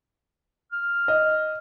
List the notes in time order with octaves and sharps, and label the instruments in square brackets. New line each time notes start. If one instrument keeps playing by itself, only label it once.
[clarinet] F6
[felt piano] D#5